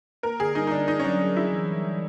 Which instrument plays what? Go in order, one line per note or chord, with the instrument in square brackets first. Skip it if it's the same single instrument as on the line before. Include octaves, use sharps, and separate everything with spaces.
[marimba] A#3 [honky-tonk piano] A#4
[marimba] D3 [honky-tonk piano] G#4
[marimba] G3 [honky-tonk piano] D#4
[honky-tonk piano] D#4
[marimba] D3 [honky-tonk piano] D4
[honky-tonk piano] D#4 [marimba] G#4
[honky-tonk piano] C#4
[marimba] F#3 [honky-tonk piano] D4
[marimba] G#4
[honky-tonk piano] E4 [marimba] G#4
[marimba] E3
G3
E3